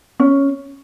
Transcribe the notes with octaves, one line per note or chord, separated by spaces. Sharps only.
C#4